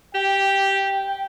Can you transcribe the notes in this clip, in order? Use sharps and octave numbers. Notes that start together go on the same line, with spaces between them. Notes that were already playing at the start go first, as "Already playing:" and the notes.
G4 G5